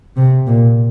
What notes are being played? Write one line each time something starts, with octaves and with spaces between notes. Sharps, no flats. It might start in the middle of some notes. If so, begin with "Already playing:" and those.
C3
A#2